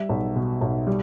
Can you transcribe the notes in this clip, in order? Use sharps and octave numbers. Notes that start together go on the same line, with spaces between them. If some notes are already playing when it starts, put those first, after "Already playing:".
Already playing: G3 E5
B1
B2
B1
G3